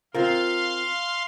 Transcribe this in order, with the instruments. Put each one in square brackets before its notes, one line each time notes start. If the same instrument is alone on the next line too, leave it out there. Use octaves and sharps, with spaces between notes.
[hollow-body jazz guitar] C4 F4 A#4 [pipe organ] F5 C6